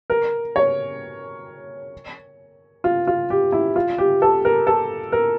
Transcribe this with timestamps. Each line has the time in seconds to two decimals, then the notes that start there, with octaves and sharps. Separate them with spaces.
0.10 A#4
0.56 C#5
2.84 F4
3.07 F4
3.30 G4
3.52 E4
3.76 F4
3.98 G4
4.22 A4
4.45 A#4
4.67 A4
5.12 A#4